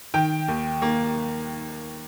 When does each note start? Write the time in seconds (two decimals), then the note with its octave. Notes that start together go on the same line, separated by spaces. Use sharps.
0.14 D#3 G5
0.48 D#2
0.82 A#3